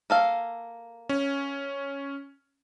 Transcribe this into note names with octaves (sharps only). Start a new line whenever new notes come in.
A#3 A4 F5
C#4